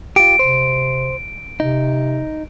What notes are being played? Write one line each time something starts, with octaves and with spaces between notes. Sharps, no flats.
F4 G4 D7
C3 C5
C3 D#4